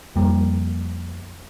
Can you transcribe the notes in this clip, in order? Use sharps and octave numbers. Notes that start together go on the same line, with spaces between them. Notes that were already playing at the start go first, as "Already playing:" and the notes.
F2 G3 A#3